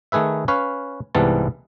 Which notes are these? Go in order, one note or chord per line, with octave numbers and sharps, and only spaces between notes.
D#3 A3 G#4 B4 E5
C#4 B4 C#5 F5
C2 G#2 E3 G3 B3 A5